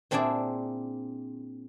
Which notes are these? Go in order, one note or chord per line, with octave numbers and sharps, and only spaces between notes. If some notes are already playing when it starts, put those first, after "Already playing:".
A#2 C4 D4 E4 G#4 D5